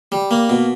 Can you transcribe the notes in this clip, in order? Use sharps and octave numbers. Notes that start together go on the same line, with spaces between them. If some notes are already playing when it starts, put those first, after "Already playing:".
G3
A#3
B2